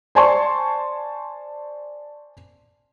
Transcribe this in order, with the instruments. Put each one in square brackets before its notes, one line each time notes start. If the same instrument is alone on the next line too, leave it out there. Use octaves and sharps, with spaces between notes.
[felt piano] C5 D5 G#5 A5 C6 C#6